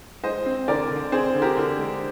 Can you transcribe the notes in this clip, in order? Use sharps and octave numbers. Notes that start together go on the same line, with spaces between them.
G#3 C5 D#5
C4
D3 A#4 D5
D3
C4 G#4 C5
D3
G4 A#4
D3
G#3